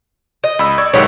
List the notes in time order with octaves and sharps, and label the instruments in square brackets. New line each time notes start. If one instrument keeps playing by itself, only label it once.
[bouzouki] D#5
[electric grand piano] C#2 B5 E6
D5 C#6 G#6
[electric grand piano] B1 G#2 D#3 [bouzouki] B3 G4 C#5